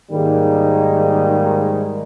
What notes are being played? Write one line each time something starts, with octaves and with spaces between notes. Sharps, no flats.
G#2 D#3 G3 G#3 A#3 D#4